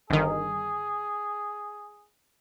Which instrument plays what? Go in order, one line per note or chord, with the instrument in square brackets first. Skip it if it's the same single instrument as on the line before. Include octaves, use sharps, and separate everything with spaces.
[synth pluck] G1 D#3 [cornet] G#4